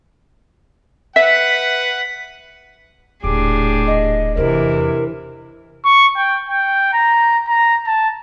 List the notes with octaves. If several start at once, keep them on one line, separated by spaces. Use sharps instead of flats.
B4 E5 F#5 B6
D#1 A2 D4 G4 G#4 D6
D#5
E2 C3 E3 E4 A#4
C#6
G5
G5
A#5
A#5
A5